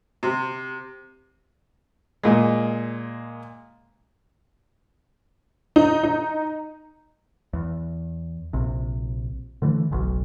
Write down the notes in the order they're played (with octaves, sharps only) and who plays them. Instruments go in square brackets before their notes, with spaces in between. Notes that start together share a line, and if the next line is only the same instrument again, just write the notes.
[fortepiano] C3
A#2 G#3
[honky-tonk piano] D#4
D#4
[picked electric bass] E2
A#1 C3
D3 E3 A3
F#1 B1